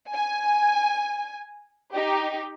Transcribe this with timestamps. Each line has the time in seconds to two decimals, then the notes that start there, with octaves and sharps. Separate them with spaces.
0.13 G#5
1.94 D#4 G4